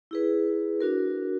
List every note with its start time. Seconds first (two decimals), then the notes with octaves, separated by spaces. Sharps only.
0.11 E4 G#4 B4
0.81 D4 F#4 A#4